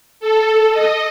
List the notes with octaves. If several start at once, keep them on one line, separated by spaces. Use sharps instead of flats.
A4
D#5